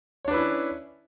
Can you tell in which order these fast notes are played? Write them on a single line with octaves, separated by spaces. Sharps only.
C#5 D4 B4 E4 C#4